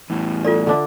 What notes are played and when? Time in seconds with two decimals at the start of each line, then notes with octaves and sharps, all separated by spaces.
0.10 E2 A2
0.44 F4 A4 D5
0.67 D3 D4 E5